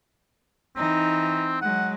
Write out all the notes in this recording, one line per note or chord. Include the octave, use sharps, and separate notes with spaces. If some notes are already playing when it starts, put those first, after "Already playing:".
E3 C4 D#4
F#3 G#3 F#5